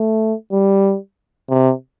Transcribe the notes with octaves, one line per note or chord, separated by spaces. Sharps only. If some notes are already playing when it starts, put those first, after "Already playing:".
Already playing: A3
G3
C3